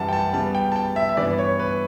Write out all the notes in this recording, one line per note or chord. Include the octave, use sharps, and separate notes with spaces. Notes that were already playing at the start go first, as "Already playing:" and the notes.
Already playing: F#2 E3 G3 F#5 A5
G5
A5
C#3 G3 B3 A5
G5
A5
G5
E5
E5
G2 E3 B3 D5
C#5
B4